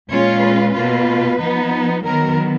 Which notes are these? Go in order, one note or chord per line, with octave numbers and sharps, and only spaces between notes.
A#2 G#3 C#4 F4 C#5
B4
B2 A#3 F4
F3 B3 D#4
D#3 F#3 B3 A#4